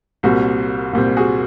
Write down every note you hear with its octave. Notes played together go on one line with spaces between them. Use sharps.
C2 A#2 G3 C4 F#4
C2 A#2 G3 C4
F#4 G#4